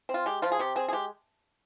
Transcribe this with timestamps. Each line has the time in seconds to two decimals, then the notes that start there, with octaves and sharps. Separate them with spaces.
0.09 C4
0.14 F4
0.26 G#3 G4
0.42 F3 F4
0.52 G#4
0.59 C3 G4
0.76 C4 G#4
0.88 G#4
0.93 G#3 G4